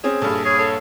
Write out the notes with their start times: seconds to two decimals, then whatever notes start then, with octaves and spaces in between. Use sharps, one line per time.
0.04 C4 C#4 G#4
0.22 A#1 G2 A4
0.45 G#4 C#5
0.59 A4 C#5